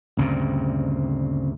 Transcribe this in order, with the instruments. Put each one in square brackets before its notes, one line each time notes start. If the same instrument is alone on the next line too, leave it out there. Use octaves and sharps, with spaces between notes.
[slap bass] D2 G2 A#2 [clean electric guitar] C#3 C4